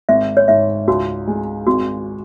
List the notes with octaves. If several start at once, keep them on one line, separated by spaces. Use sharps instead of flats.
G#1 E5
C#5
G#2 E5
C#2 F#4
G#3
G#1 F#4